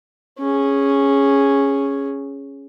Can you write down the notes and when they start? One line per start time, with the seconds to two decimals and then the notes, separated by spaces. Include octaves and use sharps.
0.39 C#4 G#4